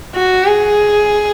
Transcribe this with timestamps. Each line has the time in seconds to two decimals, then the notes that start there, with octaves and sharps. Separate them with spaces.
0.15 F#4
0.45 G#4